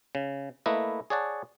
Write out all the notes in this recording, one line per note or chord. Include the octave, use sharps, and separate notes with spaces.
C#3
A3 A#3 E4 B4 D#5
G#4 C#5 D5 F#5 A5